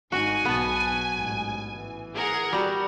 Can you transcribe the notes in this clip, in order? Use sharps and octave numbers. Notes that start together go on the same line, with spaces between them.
G#1 D#4 F#4 G#5
B1 B2 B3 A5
A1 G#2
E3
G#4 A#4 F#5
G3 F#4